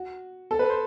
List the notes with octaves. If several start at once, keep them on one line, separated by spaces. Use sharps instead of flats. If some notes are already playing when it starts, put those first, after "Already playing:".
Already playing: F#4
A4
B4
C5